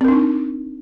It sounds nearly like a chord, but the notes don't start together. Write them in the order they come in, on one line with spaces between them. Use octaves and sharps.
C4 A#4 D4 D#4